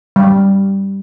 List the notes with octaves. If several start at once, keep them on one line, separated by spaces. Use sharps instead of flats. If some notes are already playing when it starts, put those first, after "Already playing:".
G3